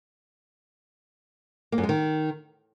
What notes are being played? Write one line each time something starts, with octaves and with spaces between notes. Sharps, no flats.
A#3
F#2
G#3
D#3